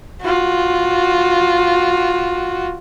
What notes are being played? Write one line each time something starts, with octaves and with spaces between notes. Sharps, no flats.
F4 F#4